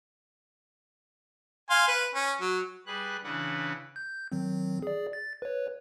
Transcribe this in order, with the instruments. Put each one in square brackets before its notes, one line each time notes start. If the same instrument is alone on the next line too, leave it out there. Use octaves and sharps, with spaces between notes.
[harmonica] F5 G#5 C6
B4
C#4
F#3
[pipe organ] G3 G#4 B4 F#6
C#3 E3 D4 B4 F#5
[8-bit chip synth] G6
D#3 F#3 C4
G#4 D5
A6
B4 C#5